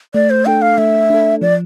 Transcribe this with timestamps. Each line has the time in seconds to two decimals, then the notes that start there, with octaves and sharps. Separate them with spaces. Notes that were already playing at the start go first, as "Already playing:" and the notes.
0.14 A3 D5
0.30 C5
0.46 D4 A4 G5
0.62 F5
0.78 A3 E5
1.10 D4 A4
1.41 F3 D5